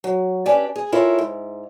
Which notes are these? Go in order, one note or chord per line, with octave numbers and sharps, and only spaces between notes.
F#3
C#4 D4 G4 B4 D5
G#4
E4 F4 A4 A#4 C#5
G#2